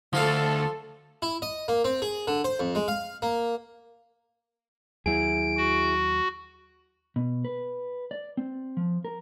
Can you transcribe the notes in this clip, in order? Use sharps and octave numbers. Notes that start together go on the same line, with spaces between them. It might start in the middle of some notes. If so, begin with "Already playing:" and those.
D2 F3 F4 A4 F5
E4
D#5
A#3
C4
G#4
D3
C5
F2
G#3
F5
A#3
D#2 F#3 E4 G#4 D7
F#4
B2
B4
D5
C4
F3
A#4